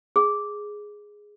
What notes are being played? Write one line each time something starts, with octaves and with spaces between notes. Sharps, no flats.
G#4